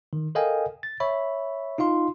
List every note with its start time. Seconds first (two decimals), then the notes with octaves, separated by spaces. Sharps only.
0.13 D#3
0.35 A4 A#4 D#5 F5 G5 G#5
0.83 A6
1.00 C#5 E5 B5
1.78 D#4 F4 F5 C6